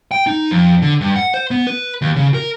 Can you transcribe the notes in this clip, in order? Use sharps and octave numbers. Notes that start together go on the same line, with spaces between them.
G5
D#4
F2
D3
G2
F#5
C5
B3
B4
D#2
C#3
A#4